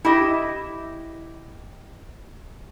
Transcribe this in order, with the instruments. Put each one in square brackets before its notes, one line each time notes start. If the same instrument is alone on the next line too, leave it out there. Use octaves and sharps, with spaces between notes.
[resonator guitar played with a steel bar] E4 G4 D#5